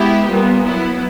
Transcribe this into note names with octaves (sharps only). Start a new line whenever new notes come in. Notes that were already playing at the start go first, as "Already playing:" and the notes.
Already playing: G#3 B3 E4 G4
A#2 G3 B3
F#3 B3 E4